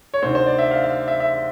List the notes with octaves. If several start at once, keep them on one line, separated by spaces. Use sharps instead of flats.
C#5
D2 C3 D#3 C5
C5
D5
E5
F5
F5
E5
E5